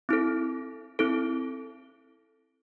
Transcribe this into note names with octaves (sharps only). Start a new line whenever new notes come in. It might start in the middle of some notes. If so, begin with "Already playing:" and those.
C4 E4 A4
C4 E4 A4